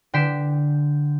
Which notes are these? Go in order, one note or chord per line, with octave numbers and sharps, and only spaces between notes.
D3 G5 B6 C7 D7 E7